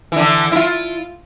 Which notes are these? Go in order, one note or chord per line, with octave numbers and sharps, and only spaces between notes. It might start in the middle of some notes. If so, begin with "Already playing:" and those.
D3 E3
E4 F4